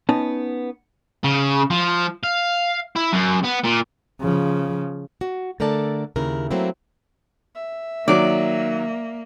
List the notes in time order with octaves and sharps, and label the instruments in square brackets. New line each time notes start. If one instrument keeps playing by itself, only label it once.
[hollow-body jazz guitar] B3 C#4 D#4 A5
[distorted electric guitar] C#3
F3
F5
E4
F#2
B3
A#2
[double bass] C#3 F3
[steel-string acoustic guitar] F#4
D3 A3 A4 A#4 D5 A5
D#2 C#3 E4 A#4
F#3 A3 A#3 C4 E4
[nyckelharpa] E5
[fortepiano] D#3 F#3 [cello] A#3 [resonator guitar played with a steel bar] D5